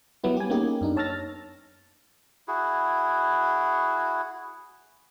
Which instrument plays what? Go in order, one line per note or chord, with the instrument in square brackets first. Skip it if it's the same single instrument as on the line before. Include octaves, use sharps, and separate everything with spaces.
[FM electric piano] F#3 G3 B3 E4
G4 G#5
A#3 B3 C#4 D#4 G4 G#4
F#2 D4 D#4
C#5 A5 E6 F6 A6 A#6
[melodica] E4 F#4 G#4